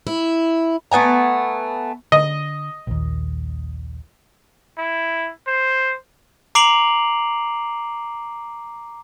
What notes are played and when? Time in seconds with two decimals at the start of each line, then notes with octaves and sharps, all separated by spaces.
0.07 E4
0.91 A3 B3 G#5 A#5
2.12 D3 D#5
2.87 A#1 D#2
4.78 E4
5.48 C5
6.55 A#5 D6 C7 D7 F7 F#7